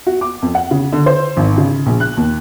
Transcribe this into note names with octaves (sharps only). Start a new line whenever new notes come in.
F#4
D6
F2
F#5
C#3
D3
C5
G#1
C#3
A#1
F#6
D#2